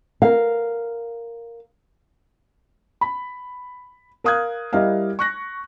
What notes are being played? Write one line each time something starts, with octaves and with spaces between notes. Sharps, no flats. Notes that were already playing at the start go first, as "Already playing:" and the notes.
A#4 F5
B5
A#4 F5 D#6 F#6 G#6
G3 E4 A#4 D#5 F5
C#6 F#6 A#6